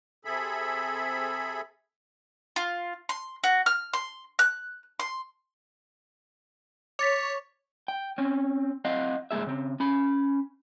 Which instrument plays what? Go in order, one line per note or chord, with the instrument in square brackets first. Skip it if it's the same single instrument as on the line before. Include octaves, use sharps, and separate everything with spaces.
[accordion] C3 G#4 A4 E5 B5
[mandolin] F4
C6
F#4
F6
C6
F#6
C6
[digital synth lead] C#5 [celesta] D6 A6 B6
[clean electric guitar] G5
C4 C#4
C4 D#5 F5 F#5
C#2 G#2 A#3 G#4 E5
C#3 C4
C#4 B5